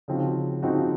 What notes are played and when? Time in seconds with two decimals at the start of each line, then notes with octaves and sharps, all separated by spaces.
0.08 C#3 F3 C4 D#4 F#4
0.62 C#3 F3 C4 D#4 F#4